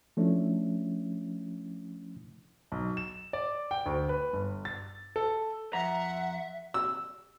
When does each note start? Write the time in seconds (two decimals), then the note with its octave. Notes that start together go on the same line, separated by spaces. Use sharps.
0.17 F3 A3 C#4 D4 E4
2.72 B1
2.97 E7
3.33 D5
3.71 G5
3.86 D2
4.09 B4
4.33 G1
4.65 A6
5.16 A4
5.73 F2 E5 F#5 A#5
6.74 E6